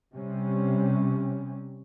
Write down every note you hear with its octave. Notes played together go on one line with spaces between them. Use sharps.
C3 G3 C#4